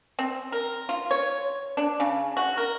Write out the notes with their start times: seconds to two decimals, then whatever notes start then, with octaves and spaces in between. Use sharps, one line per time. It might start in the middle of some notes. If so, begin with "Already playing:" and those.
0.19 C4
0.52 A#4
0.89 F4
1.11 C#5
1.77 D4
2.00 C#3
2.37 F#4
2.58 A#4